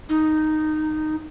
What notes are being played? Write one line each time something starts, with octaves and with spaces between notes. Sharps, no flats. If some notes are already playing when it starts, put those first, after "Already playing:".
D#4